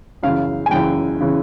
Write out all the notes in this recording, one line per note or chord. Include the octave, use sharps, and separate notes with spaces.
F#2 C#3 E3 F5
G#5
F#2 C#3 E3 G5
C#3 E3